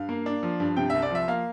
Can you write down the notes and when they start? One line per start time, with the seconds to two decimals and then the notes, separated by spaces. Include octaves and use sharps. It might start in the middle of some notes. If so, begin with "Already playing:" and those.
Already playing: G2 F5
0.09 A#3
0.26 D4
0.43 F3
0.60 G2
0.76 C3 G5
0.90 C2 E5
1.02 D5
1.11 F3 E5
1.28 A#3 F5